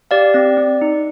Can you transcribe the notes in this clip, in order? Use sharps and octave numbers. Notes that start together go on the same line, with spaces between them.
G4 D5 F5
C4 D5
C4
D#4